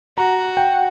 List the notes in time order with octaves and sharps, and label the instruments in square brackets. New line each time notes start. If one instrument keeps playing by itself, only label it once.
[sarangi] F#4 [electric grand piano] A#5
[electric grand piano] G5